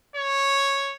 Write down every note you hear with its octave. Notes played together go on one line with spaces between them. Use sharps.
C#5